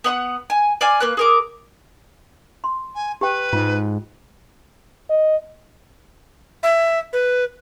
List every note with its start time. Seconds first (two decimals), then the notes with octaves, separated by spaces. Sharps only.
0.04 B3 F#5 C6 D#6
0.50 G#5
0.81 D5 F5 G#5
1.00 A#3 B4 F#6
1.17 G#4 A#4 D6
2.64 C6
2.94 G#5
3.21 G4 B4 G5
3.53 G#2 F4
5.10 D#5
6.63 E5
7.13 B4